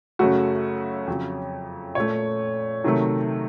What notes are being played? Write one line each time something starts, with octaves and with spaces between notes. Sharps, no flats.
F#2 C#3 A3 F#4
F2 C#3 F#3
A#2 A3 C#5
C3 D#3 F#3 A3